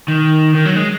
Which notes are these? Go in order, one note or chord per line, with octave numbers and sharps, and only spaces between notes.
D#3
D#3
F#3
G#3